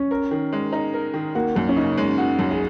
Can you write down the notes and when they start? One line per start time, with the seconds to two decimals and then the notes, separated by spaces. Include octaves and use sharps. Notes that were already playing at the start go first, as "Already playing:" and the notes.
Already playing: C#4
0.11 A#4
0.31 D#3
0.52 G#3
0.72 D#4
0.93 A#4
1.14 D#3
1.35 A#3 F#4
1.56 F#2 A#3
1.69 C#4
1.76 C#3 D#4
1.97 G#3
2.18 F#4
2.39 F#2
2.51 G#4